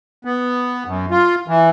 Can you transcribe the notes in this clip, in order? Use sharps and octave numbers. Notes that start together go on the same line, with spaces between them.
B3
F#2
F4
E3